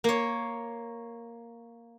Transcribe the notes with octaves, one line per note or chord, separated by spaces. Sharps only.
A#3 C#5